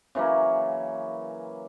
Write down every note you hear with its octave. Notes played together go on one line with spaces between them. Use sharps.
C#3 E3 F#3 A#3